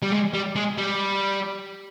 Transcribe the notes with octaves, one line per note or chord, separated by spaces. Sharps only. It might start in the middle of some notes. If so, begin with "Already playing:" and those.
G3
G#3
G3
G#3
G3